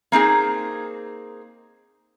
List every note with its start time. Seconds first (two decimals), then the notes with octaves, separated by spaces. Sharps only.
0.12 A#3 C4 D#4 G#4